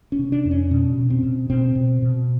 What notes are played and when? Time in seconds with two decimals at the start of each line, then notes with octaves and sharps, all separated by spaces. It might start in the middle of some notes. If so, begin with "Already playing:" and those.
0.12 C#4
0.19 C3
0.32 D4
0.45 F2
0.51 C#4
0.71 B2 C#4
0.98 B2
1.10 C4
1.23 B2
1.50 B2 C4
1.75 B2
2.02 B2